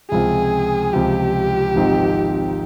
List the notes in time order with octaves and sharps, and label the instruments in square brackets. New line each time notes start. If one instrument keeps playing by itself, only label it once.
[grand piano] C#2 C3 F3 C4 F4 [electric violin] G#4
[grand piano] C#2 C3 F3 C4 F4 [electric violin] G4
[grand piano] G#1 G#2 F3 C4 D#4